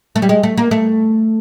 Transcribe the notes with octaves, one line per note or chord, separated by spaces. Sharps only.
A3
G3
G#3
A3
A#3
A3